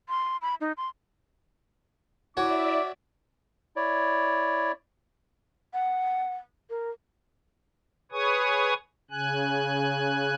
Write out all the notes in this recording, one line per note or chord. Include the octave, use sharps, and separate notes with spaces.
C6
B5
D#4
C6
E4 F#4 C#5 D5 E5 G#5 D6
E4 C#5 D5
F#5
A#4
G#4 B4 C#5 G#5 C#6 D#6
C#3 G#5 F#6